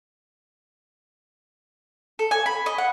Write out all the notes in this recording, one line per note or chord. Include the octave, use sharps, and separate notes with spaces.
A4
G#5
B5
D#5
F#5